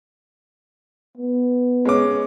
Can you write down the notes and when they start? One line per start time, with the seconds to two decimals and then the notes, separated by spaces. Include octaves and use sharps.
1.18 B3
1.85 G#3 C#4 D6